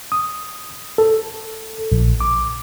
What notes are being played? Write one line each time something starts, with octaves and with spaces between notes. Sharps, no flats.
D#6
A4
A#1
D6